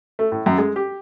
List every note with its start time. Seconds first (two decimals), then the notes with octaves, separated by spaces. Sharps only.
0.19 A3
0.32 A2
0.46 F#2
0.58 G#3
0.76 G4